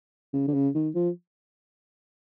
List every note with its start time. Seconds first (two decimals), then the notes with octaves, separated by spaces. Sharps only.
0.33 C#3
0.48 D3
0.54 C#3
0.75 D#3
0.95 F3